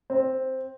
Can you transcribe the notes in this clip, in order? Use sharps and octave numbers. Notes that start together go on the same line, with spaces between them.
C4